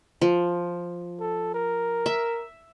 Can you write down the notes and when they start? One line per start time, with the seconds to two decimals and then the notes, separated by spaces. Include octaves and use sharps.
0.21 F3
1.20 A4
1.54 A#4
2.06 E5